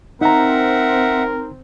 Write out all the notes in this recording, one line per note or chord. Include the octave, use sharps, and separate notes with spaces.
C4 D#4 A#4 E5 F#5 A#5